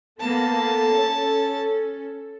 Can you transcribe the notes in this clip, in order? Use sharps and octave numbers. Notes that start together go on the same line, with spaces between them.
A#3 B3 A4 A5
C#4